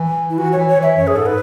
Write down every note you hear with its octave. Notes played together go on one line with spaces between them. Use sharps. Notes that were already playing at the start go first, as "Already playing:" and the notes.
Already playing: E3
E4
E3 F#4
C#5
E3
C#5
E3
E5
F#2 C#5
G#4
G#2 A4
B4